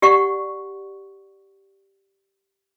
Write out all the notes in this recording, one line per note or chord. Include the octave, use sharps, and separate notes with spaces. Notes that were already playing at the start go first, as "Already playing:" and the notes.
G4 D5 F#5 C#6